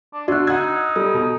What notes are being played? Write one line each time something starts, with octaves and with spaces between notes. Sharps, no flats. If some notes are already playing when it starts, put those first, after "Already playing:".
D4
D3 A3 D4 F#4 F#6
D#4 F#5 E6 G#6
G3 A4
B2